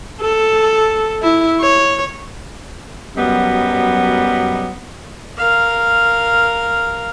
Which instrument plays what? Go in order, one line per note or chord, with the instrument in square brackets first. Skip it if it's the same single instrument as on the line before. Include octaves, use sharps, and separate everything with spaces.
[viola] A4
E4
C#5
[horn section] F#2 F#3 G3 B3 D#5
[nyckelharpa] A#4 F5